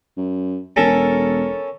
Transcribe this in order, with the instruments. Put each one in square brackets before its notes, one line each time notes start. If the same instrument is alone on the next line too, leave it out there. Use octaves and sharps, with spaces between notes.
[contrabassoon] F#2
[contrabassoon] E1 [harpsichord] C#4 A4 A#4